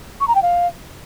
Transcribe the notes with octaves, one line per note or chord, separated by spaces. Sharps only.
C#6
A#5
G5
F5